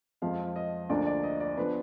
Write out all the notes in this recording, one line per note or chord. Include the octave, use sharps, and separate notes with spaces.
F2 F3 G#3 F5
D#5
D2 D3 F3 A#3 D4 D5
D5
D#5
D5
F3 B3 D4 B4